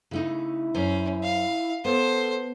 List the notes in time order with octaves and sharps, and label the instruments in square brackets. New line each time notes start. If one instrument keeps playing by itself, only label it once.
[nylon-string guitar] C#3 A3 D#4 [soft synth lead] E4
[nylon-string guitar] F#2 C5 [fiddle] C#4
[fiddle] F5
[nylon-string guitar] B3 [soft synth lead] A4 [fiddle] C5